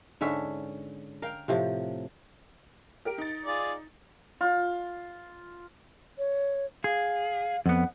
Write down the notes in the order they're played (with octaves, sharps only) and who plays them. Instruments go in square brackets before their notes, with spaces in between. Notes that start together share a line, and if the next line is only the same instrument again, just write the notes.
[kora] G#2 D3 C#4 E5
A#4 F5 G5
A2 C3 F3
[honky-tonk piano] G4 A#4 D7
D#4 A6
[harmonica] F4 G#4 D5
[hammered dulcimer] F4
[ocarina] C#5
[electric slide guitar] G#4 [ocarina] F5
[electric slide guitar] F2 B3 [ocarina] F#5